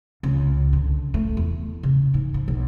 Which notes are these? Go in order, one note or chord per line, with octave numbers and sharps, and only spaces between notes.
C#2
D3
A3
E2
C#3
G#2
F3
B1